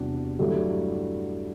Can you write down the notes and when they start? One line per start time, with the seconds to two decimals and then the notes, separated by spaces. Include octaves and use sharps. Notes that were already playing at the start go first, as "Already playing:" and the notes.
Already playing: E2 C3 G3 D4 F#4
0.39 G2 F#3 A3 E4 G4